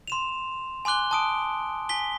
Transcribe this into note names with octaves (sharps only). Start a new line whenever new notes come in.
C6 E7 F7
G#5 C6 D6 F#6 G7
A5 D#6 D7
G#5 B6 G7